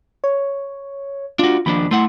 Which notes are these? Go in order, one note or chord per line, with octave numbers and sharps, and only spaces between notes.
C#5
D4 F4 F#4
D#2 F3 D4 B5
A3 E4 F#5 C6